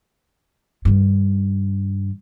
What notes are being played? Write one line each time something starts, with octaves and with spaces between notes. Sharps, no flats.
G2 D#3